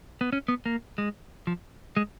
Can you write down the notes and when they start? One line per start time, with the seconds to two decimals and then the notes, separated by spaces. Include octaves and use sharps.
0.21 B3
0.33 C#4
0.48 B3
0.66 A#3
0.98 G#3
1.47 F3
1.97 G#3